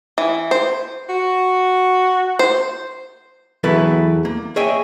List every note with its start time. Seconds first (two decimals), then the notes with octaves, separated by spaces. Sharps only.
0.18 E3
0.51 C5
1.09 F#4
2.39 C5
3.64 E2 F#3 E4 A4 B4 E5
4.25 A#3
4.56 G#4 C#5 D#5 E5 G5 G#5